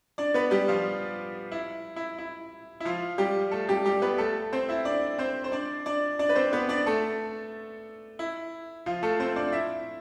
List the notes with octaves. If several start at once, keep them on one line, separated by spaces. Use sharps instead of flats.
D4 D5
B3 B4
G3 G4
F3 F4
E4
E4
E4
E4
F3 F4
G3 G4
A3 A4
G3 G4
G3 G4
B3 B4
A3 A4
C4 C5
E4 E5
D4 D5
C4 C5
C5
D4 D5
D4 D5
D4 D5
B4
C4 C5
B3 B4
D4 D5
A3 A4
E4
F3 F4
A3 A4
C4 C5
D4 D5
E4 E5